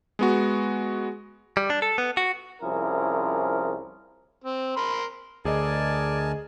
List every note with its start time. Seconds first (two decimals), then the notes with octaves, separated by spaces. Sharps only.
0.19 G#3 B3 F#4
1.57 G3
1.70 D4
1.82 A4
1.98 B3
2.17 F#4
2.62 C2 F3 C#4 E4 G#4 A#4
4.44 C4
4.77 A#4 B5 C6
5.45 D2 G#4 A#4 D5 D#5 G#5 A5